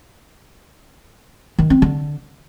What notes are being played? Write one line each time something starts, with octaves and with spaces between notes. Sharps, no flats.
D#3
C4
D3